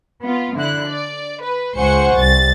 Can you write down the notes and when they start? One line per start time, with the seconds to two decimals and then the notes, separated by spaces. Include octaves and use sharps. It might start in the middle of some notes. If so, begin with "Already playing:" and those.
0.24 B3 F4
0.56 D3 E4 F#6
0.87 D5
1.41 B4
1.77 C#2 C5 F#5 G#5 C#6 C#7
2.17 C2 A6